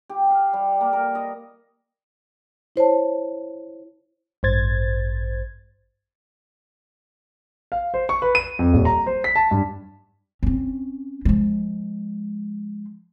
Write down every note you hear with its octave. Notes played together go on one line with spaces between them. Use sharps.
G4
F5
G3
A#3
A#4
D#5
E4 C5 C#5 A5
A1 G2 C5 G#6 A6
F5
C5
C#6
B4
D#7
F2
D#1
A#5
C5
B6
A5
G2
C4 C#4
F3 G#3